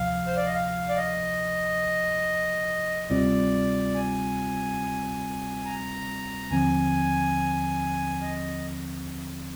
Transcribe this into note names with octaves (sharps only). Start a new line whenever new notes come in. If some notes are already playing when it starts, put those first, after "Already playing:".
Already playing: D2 C3 F3 F5
C5
D5
D#5
F5
D5
D#5
D2 C3 G3 C4 F4 D5
G#5
A#5
D#2 D3 F3 C4 G#5
D#5